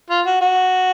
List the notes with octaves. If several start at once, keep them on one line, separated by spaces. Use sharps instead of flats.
F4
F#4
F#4